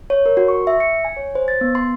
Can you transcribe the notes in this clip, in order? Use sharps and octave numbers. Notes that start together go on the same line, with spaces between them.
C#5
A#4
F#4
C#6
E5
C#7
G#5
C#5
C5
A6
B3
C6